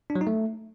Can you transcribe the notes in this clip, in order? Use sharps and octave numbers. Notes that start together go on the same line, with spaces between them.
D4
F#3
D#4
A3